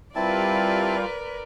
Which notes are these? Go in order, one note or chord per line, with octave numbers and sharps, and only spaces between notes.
G3 C4 E4 F4 A#4 B4 D5 A5